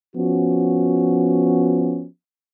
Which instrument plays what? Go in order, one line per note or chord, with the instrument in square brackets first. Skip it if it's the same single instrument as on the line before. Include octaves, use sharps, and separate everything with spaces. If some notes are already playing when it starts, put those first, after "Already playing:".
[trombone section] F3 B3 C#4 F#4